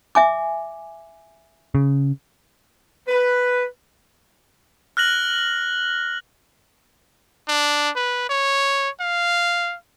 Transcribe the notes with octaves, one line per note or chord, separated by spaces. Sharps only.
E5 G#5 D6
C#3
B4
F6 F#6 A#6 F#7
D4
B4
C#5
F5